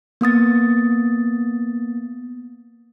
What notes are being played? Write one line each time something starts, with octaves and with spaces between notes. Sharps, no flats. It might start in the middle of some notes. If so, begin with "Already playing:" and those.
A#3 B3 D#6 A6